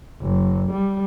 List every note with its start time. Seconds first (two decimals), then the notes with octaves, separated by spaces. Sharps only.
0.21 F#1
0.72 G3